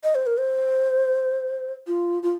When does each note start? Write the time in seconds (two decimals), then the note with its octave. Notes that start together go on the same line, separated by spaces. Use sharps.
0.04 D#5
0.15 C5
0.26 A#4
0.38 C5
1.87 F4
2.23 F4